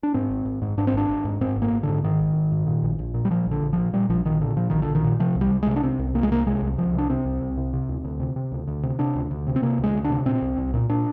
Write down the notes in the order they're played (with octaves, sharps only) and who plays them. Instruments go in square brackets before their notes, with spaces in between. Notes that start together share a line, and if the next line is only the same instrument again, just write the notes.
[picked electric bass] D4
G#2 C4
G#1
G#1
G#2
G#2 D4
C4
G#1 D4
G#1
G#2
G#2 C4
G#1
A#3
G#1
G#2 D3
G#2 D#3
G#1
G#1
G#2
A#2
A#1
A#1
A#2
G3
A#2 F3
A#1
D3
A#1
F3
A#2
A#2 G3
A#1 F3
A#1 D#3
A#2 D3
A#2 F3
A#1 D#3
D3
A#1
D#3
A#2
C3 F3
C2
G3
C2
C3 G#3
D4
C3 C4
C2
C2 A#3
G#3
C3 A#3
C3 G#3
C2
C2 F3
C3 D4
C3 C4
C2
C2
C3
C3
D2
D2
C3
C3
D2
D2
C3
C3 D4
D2
D2
C3
C4
C3 A#3
D2 G#3
D2
D4
C3
A#2 C4
C2
C2
A#2
A#2 D4